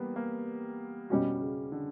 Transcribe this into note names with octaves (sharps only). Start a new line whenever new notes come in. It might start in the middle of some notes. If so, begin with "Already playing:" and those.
Already playing: E3 G3 A#3 B3
A#3
B2 G3 C#4 F#4
C#3
D3